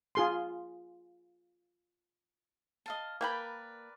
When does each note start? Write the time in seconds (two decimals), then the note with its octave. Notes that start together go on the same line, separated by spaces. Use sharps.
0.15 F4 G#4 C6
2.86 D#5 F5 A5
3.21 A#3 A#4 B4 D5 G5 B5